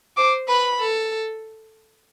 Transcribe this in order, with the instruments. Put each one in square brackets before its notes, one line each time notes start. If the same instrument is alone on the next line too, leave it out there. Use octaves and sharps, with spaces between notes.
[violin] C5 [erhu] D6
[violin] B4 [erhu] B5
[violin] A4